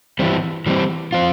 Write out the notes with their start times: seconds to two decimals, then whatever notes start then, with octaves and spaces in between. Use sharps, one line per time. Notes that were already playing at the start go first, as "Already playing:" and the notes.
0.19 E3 G3 C4
0.66 E3 G3 C4
1.13 F3 C4 F4